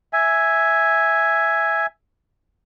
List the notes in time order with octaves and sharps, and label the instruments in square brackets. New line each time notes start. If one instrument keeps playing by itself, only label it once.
[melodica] E5 G#5